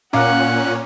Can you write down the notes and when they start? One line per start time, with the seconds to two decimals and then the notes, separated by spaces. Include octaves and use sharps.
0.13 A#2 C#4 F5 F#5 A#5 D6 F#6